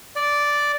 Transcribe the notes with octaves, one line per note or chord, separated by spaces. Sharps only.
D5